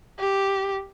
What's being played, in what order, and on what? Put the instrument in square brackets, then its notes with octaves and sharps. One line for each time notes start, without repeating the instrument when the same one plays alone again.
[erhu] G4